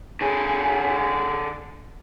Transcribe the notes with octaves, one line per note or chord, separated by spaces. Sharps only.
D3 G#4